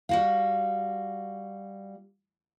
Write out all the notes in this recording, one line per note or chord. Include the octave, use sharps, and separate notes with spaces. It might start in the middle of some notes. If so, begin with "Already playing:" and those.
G3 F#4 F5